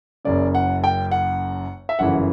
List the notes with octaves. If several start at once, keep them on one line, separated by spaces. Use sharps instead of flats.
F#1 F#2 C#3 D5
F#5
G5
F#5
E5
G1 F#2 C#3 E3 F#5